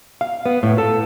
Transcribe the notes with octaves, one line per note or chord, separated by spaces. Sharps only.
F5
B3
A2
A4